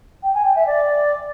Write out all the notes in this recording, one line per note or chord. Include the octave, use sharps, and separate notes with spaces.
G5
G#5
G5
E5
D5